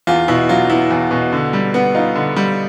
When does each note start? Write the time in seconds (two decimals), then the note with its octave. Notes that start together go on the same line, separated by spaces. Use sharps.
0.07 E2 F4
0.28 B2 E4
0.49 F#3 F4
0.70 B3 E4
0.90 E2
1.11 B2
1.33 D3
1.53 G3
1.74 B3
1.95 D#4 F4
2.16 D3
2.36 G3